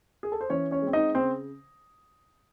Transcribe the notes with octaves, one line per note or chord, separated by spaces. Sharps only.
G#4
A4
C5
E3 C#4 C#5
C#4 C#5
G#3 C4
D#4 D#5
C#3 C4 C5